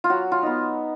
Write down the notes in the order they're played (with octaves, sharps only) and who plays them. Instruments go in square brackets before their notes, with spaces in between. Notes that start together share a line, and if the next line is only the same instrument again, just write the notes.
[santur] F4
F#3 F#4
F4
B3 D#4